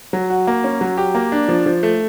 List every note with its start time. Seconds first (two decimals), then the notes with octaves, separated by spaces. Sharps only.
0.13 F#3
0.30 F#4
0.47 A#3
0.64 C#4
0.81 F#3
0.98 G4
1.15 A#3
1.32 D4
1.49 F3
1.66 F3
1.83 A3